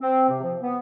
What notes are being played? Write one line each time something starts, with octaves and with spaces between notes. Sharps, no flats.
C4
C3
F3
B3